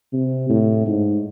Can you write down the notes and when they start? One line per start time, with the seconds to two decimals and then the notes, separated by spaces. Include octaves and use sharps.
0.13 C3
0.49 A2
0.86 G#2